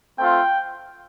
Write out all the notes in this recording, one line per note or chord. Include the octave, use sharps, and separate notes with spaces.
A3 C4 F4 G5